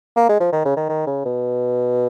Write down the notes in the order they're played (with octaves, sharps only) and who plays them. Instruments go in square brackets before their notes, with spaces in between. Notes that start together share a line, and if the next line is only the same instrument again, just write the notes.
[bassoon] A#3
G#3
F3
D#3
C#3
D#3
D#3
C#3
B2